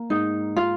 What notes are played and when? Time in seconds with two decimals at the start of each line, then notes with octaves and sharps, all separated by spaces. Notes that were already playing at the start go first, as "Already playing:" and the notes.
Already playing: A#3
0.10 G#2 D#4
0.57 F4